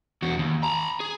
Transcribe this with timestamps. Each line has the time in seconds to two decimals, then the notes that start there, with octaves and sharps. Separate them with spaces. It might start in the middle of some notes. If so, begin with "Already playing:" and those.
0.22 E2 F#4
0.39 D#2
0.63 A#5 B5
1.00 G#4